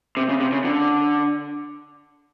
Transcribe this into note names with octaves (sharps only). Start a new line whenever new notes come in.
C3
C#3
C3
C#3
D3